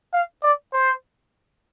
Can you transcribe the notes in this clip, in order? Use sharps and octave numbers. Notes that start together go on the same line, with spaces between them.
F5
D5
C5